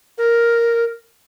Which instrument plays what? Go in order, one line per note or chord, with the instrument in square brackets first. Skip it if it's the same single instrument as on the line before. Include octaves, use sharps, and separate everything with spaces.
[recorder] A#4